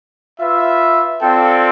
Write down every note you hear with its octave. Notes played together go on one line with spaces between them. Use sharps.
F4 B4 E5
C4 F4 A4 D5 G5